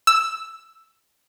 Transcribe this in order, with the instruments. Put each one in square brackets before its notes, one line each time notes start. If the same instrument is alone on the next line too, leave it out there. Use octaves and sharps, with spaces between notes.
[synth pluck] E6